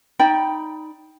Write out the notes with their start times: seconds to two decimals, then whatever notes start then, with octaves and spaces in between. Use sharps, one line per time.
0.19 D#4 D5 G5 B5